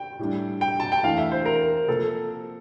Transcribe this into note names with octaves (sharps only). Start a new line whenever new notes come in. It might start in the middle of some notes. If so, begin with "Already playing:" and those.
Already playing: G5
A2 G3 D4
G5
A5
G5
E2 E3 A3 D4 F5
E5
C5
A#4
C3 F3 A#3 A4